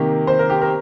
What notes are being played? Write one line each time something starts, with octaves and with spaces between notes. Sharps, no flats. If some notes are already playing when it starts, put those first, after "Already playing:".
Already playing: C3 D#3 A#3 G4
C5
A#4
G4
A#4